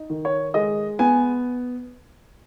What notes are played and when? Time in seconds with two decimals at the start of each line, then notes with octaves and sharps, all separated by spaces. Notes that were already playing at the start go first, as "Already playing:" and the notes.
Already playing: D#4
0.10 D#3
0.25 C#5
0.54 G#3 D#5
0.99 B3 G#5